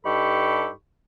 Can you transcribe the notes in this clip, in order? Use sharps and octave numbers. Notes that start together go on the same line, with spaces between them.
G2 D#4 G4 A4 B5 C#6